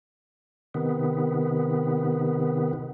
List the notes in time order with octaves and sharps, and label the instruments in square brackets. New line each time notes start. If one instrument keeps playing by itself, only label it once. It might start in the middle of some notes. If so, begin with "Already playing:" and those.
[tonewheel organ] C3 D#3 B3